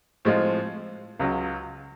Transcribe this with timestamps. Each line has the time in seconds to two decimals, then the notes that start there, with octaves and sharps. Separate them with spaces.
0.25 A2 F3 G#3 C4 F4
1.19 C#2 C#3 F#3